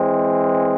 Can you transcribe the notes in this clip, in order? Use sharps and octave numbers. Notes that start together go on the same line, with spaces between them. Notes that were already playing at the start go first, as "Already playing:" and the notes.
Already playing: E3 G#3 C4